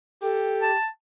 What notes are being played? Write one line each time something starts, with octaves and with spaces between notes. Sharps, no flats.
G4 A4
A5